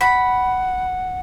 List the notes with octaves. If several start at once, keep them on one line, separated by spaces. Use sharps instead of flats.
F#5 B5